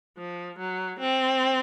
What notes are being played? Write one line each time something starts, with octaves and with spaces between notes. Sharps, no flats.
F3
F#3
C4